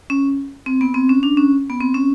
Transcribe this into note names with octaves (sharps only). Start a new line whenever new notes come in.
C#4
C4
B3
C4
C#4
D4
C#4
B3
C4
C#4